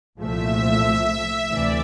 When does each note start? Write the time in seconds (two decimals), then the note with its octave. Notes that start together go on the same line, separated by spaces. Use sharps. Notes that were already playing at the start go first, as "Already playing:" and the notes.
0.19 C2 A#2 F3 A3 E5
1.50 D2 C3 E3 A3 D5